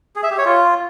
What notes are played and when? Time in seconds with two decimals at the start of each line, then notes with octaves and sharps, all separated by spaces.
0.16 G#4
0.23 E5
0.31 G4
0.38 C#5
0.45 F4